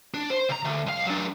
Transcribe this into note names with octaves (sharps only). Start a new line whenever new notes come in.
D4
C5
C#2 A#5
D2
B1 F5
F#3 D4